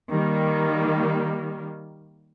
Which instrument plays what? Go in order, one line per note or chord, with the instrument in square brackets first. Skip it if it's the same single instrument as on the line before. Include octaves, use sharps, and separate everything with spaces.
[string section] D#3 G3 A#3